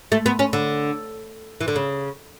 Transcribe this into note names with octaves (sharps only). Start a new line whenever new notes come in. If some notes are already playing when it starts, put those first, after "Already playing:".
A3
B3
C#4
D3
E3
D3
C#3